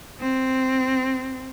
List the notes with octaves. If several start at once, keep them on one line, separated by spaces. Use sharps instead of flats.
C4